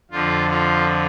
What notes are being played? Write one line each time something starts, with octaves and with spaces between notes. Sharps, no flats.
F2 D3 F3 F4
F4